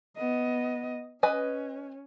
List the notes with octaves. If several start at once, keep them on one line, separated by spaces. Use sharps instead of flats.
B3 D#5
C#4 B4 D#5 G#5